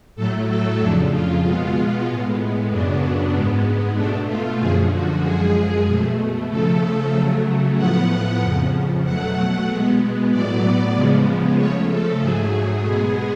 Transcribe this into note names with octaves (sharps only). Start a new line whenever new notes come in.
A2 F#3 A3 A4
A4
F2 C#3 F3 D4
F4
B2 G#3 B3 F4
A2 G#3 B3
F#2 C#3 F#3 B3 D4
G#2 G#3 B3
B2 A3 D4
F4
F#2 D3 F3 G#4
F#4
F#2 F3 G#3 G#4
B2 A3
C#3 F3 A3 A4
C#3 F#3 A3
A2 F3 B3 F#5
F2 C#3 F3
B2 F#3 A3 F#5
B2 G#3 B3
A2 F#3 B3 D5
C#3 F3 G#3 B3
C#3 F3 A3 C#5
A4
G#2 F#3 A3 G#4
B2 G#3 B3 G#4